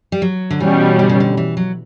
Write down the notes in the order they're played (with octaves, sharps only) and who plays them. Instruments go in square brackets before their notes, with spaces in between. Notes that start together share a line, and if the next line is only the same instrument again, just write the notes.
[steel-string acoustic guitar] G3
F#3
D3
[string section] B2 G3 C#4 [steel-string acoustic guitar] E3
[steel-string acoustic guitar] D3
C#3
D3
E3
F#3